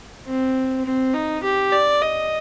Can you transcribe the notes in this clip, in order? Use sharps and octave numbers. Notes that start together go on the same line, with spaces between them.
C4
C4
D#4
G4
D5
D#5